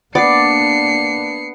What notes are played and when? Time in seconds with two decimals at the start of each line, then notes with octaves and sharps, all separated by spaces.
0.15 A#3 B3 D4 D5 C7 C#7